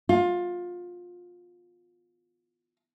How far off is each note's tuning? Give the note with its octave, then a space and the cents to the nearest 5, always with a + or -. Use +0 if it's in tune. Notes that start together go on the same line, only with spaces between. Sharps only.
F4 +20